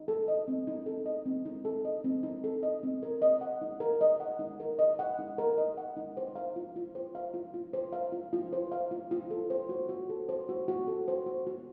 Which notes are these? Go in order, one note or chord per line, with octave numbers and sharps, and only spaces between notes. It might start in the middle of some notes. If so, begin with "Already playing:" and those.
Already playing: D#4
A4
D#5
C4
D#4
A4
D#5
C4
D#4
A4
D#5
C4
D#4
A4
D#5
C4
A#4
D#5
F#5
D#4
A#4
D#5
F#5
D#4
A#4
D#5
F#5
D#4
A#4
D#5
F#5
D#4
C5
F5
F4
F4
C5
F5
F4
F4
C5
F5
F4
F4
C5
F5
F4
F4
A4
C5
F#4
F#4
A4
C5
F#4
F#4
A4
C5
F#4
F#4